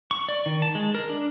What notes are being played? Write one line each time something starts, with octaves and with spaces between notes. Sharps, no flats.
C#6
D5
D#3
A5
G#3
A#4
D4